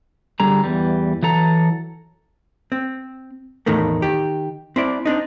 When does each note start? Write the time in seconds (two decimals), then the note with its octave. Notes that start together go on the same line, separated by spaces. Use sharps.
0.40 D3 G3 G#4 A#5
0.64 E2 E3 G3
1.23 E3 F#3 A4 A#5
2.72 C4
3.66 E2 A2 D#3 A3 A#3
4.02 D#3 G4
4.76 C4 E4 D5
5.05 C4 D4 D#4